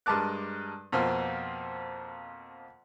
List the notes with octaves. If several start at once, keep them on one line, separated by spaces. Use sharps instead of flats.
G2 G#3 A#4 A5 D6 F#6
F2 B2 A#3 C4 F4 F6